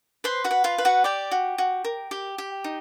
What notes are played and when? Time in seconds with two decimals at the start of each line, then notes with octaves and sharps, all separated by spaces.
0.24 B4 C5 C6
0.44 F#4 F#5
0.51 B4
0.64 F4 F5
0.78 B4
0.85 F#4 F#5
1.04 G4 D5 G5
1.31 F#4
1.58 F#4
1.84 A#4
2.11 G4
2.38 G4
2.64 D#4